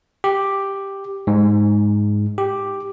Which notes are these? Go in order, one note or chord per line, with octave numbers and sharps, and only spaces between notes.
G4
G#2
G4